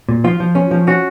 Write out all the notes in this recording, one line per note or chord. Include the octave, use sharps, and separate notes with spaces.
A#2
F3 F4
F3
C#4
F3
C#4 F#4